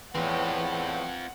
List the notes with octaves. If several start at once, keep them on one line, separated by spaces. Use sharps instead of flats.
E2 A2 C4 F4 B4 F#5 G5 B5